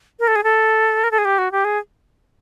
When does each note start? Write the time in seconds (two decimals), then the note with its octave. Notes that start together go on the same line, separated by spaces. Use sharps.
0.20 A#4
0.28 A4
0.36 G#4
0.44 A4
1.04 A#4
1.11 A4
1.18 G#4
1.25 G4
1.38 F#4
1.52 G4
1.65 G#4